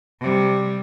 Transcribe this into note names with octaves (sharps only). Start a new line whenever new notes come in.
C3 G3